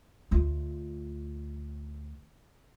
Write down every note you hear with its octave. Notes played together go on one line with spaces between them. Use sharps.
D2 F4